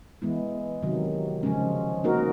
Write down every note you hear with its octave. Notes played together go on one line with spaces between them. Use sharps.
E3 G#3 B3 E4
C3 D#3 F#3
C#3 F3 G#3 C#4
A#3 D#4 F#4 A#4